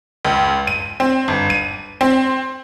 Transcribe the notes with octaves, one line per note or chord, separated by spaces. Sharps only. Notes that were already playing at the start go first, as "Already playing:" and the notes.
C#2
D#7
C4
G1
D#7
C4